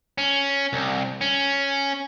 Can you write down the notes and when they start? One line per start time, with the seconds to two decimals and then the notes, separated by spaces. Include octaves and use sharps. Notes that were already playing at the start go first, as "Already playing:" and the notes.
0.18 C#4
0.73 C2
1.21 C#4